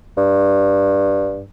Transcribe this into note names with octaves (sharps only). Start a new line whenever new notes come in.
G2